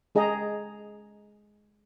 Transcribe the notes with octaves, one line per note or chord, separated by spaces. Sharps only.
G#3 G#4 D#5 G5 A#5